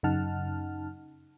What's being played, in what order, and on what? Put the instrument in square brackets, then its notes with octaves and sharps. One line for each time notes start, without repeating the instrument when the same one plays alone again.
[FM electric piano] F#2 C#3 D#4 F#5 A5 F6